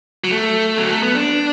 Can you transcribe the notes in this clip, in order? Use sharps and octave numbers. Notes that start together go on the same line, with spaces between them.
F#3
A3
F#3
A3
B3
D4